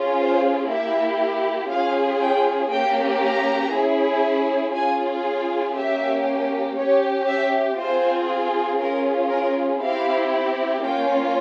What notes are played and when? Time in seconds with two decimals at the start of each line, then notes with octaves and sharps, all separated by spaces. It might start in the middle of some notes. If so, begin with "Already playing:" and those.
Already playing: C#4 F4 G#4
0.18 C5
0.69 A#3 E4 G4 E5
1.70 C#4 F4 G#4 F5
2.21 G5
2.71 A#3 C#4 G4 G5
3.22 A#5
3.72 C#4 E4 G#4
4.74 C#4 F4 G#4 G#5
5.75 A#3 C#4 G4 E5
6.76 C#4 G4 C#5
7.27 E5
7.78 C4 F4 G#4 C5
8.79 C#4 F4 G#4 A#4
9.29 A#4
9.80 C4 E4 G4 F5
10.81 A#3 C#4 F4 G5